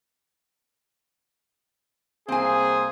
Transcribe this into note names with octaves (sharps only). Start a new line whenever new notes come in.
C2 A#3 C4 G#4 C5 G#5